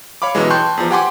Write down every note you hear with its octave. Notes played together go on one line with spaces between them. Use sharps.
C#5 F5 B5 D6
F#2 B2 E3 G#3
G5 A5 C6 C#6 F#6 G6
E2 F3
G4 F#5 G#5 C6 D6